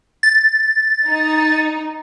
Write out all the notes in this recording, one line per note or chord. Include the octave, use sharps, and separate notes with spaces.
A6
D#4